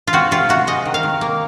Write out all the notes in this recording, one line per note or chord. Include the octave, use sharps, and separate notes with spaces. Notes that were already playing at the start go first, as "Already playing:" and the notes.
F4
C4 F#4
C3 F4
C3 F#4
G#3 D#5
D#3
F5
D#3
A#3